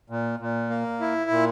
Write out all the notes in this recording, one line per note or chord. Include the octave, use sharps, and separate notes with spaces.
A#2
A#2
A#3
E4
A#2